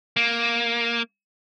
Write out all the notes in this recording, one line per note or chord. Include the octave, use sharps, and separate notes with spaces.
A#3